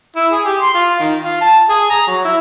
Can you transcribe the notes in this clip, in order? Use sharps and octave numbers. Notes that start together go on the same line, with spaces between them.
E4
G#4
G4
C6
F4
D#3
F4
A5
G#4
A#5
F#3
E4